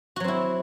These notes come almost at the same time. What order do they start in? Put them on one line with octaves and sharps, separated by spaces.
F#4 F#3 C4 E4